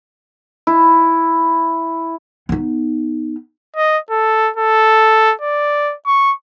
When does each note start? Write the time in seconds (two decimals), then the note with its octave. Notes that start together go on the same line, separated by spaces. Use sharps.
0.67 E4
2.49 B3 D#4
3.76 D#5
4.11 A4
4.57 A4
5.41 D5
6.07 C#6